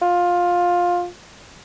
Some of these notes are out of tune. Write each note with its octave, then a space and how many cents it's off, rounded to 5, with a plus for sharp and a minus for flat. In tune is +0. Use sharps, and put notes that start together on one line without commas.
F4 +15